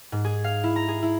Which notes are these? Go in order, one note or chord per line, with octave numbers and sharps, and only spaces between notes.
G#2
G#4
F5
E4
A#5
G#4
E4